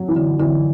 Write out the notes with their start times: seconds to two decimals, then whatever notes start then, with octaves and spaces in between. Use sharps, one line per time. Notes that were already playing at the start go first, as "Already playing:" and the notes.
Already playing: F#3
0.08 E3
0.16 D3
0.39 D3 E3